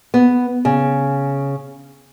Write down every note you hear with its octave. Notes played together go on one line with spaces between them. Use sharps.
B3
C#3